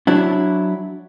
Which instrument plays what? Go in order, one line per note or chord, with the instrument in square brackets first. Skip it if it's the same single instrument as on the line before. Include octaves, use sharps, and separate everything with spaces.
[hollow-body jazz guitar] F#3 D4 E4